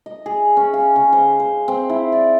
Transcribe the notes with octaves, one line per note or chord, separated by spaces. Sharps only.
D#5
G#4
C#4
F5
C#3
C5
C5
C4
E4
D5